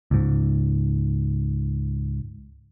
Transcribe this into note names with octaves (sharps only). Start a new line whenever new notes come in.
C#2 G#2